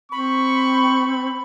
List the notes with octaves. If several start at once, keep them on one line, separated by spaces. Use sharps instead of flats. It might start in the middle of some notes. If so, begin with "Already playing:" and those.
C4 B5 C#6